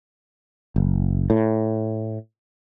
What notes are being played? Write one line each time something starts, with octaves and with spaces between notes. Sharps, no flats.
F#1
A2